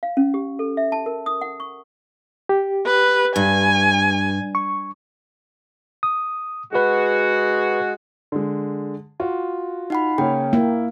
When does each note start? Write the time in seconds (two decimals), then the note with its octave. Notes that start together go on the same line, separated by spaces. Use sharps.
0.03 F5
0.17 C#4
0.34 G4
0.59 A4
0.77 E5
0.92 A5
1.06 A#4
1.26 D#6
1.41 F#5
1.60 C#6
2.49 G4
2.86 B4
3.36 G2 G#5
4.55 C#6
6.03 D#6
6.73 G#3 F#4 G#4 B4
8.32 D3 G#3
9.20 F4 F#4
9.90 D#4 F#5 B5
10.18 C#3 A#3 C#4 G5
10.53 A#3 E4